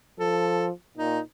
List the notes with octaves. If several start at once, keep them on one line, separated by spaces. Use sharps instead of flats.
F3 A4
A#2 D#4